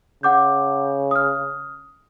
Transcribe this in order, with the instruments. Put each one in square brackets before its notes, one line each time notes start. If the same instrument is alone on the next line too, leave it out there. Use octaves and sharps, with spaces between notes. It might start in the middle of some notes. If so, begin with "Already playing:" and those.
[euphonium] C#3 [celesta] F#5 D6 G6
[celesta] D#6 F6